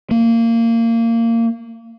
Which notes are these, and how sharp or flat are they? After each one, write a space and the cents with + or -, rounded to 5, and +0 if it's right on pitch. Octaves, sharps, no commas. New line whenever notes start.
A#3 -20